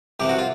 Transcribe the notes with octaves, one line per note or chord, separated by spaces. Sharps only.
C2 C3 E3 G4
F#4
F4